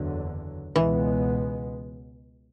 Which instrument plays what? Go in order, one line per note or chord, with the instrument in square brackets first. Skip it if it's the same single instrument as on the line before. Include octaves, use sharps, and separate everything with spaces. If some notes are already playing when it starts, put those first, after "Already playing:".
Already playing: [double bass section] F#1 E2 D3 F#3
[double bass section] C#2 B2 G#3 B3 [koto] E3